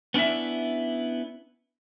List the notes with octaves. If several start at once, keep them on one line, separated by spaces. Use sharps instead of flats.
B3 C#4 D4 E4 E5